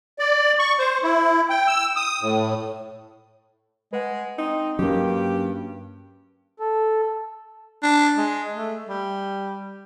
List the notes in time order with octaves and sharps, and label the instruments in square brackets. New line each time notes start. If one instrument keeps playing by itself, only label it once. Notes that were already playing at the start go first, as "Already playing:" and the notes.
[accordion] D5
C#6
C5
E4
G5
E6
D#6
A2
[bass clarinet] G#3 [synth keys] B4 F#5
[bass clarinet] C4 [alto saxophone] D#4 [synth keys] A#5
[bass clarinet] G2 [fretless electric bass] F#3 A#3 [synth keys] C#4 [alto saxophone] G4
[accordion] A4
[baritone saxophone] D4
G#3
A3
G3